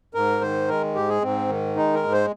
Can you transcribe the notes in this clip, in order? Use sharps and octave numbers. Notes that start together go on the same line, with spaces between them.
G#2 A#4
D#3 C5
G#3 A#4
G#2 G4
G#4
G#2 C4
D#3
G#3 D#4
A#4
G#2
C5